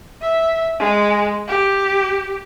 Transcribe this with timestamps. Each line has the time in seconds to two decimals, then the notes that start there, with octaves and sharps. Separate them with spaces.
0.22 E5
0.79 G#3
1.48 G4